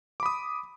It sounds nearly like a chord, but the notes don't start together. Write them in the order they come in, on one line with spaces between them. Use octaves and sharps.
D6 B5 D#6